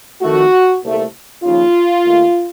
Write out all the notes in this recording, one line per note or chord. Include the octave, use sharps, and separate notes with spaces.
F2 D#3 A3 F#4
C2 A#2 A3
D#2 C#3 F3 F4
D#2 D#3 A3